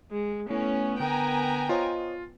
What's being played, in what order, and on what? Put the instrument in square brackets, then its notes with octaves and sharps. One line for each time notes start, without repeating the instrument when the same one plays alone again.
[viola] G#3
[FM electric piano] A3 E4 [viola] B3 [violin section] C#4
[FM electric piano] D3 A#4 [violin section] G5 G#5 A#5
[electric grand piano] F4 [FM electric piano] C5 C#5 D#5